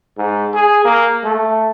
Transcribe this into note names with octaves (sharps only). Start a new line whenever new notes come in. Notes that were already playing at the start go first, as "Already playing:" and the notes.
G#2
G#4
A#3
A3